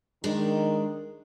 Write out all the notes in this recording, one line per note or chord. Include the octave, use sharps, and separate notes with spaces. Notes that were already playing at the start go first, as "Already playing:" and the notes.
D#3 G#3 D4